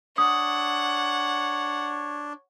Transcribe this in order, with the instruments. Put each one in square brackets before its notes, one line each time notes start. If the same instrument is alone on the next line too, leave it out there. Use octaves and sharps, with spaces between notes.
[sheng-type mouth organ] D4 [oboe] C#5 [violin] F#5 [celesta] D#6